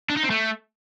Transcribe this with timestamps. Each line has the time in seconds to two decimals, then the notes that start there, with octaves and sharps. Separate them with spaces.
0.10 D4
0.17 D#4
0.23 C4
0.30 A3